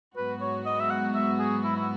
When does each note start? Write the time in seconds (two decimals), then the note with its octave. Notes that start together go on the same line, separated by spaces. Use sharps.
0.17 G#2 F#3 B3 F#4 B4
0.41 C#5
0.66 D#5
0.80 E5
0.90 F#5
1.15 E5
1.39 G#4
1.64 E4
1.76 E4